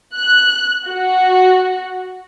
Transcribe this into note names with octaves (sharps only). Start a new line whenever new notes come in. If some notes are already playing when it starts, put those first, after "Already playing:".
F#6
F#4